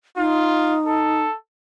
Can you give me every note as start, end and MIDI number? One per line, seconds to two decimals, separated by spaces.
0.17 1.23 63
0.17 0.75 65
0.86 1.35 69